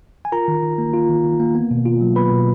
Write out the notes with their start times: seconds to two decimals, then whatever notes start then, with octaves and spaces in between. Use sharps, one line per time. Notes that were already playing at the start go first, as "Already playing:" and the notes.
0.25 G#5
0.32 F4 A#4 A#5
0.48 D#3
0.63 D#3
0.78 A#3
0.94 F4
1.09 D#3
1.24 D#3
1.40 A#3
1.55 B3
1.71 B2
1.86 F4
2.01 F#3
2.16 B3 B4 B5
2.31 B2